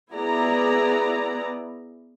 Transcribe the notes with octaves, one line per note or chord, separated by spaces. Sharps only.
B3 E4 G#4 D5 A#5